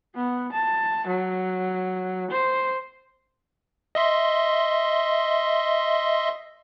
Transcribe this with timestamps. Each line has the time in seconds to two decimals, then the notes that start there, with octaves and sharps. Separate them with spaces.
0.15 B3
0.53 A5
1.07 F#3
2.31 C5
3.95 D#5 E5 C6